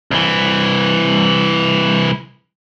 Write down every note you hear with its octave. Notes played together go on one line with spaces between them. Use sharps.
C2 E3